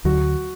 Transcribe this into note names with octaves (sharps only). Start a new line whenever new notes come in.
D2 D3 F#3 F#4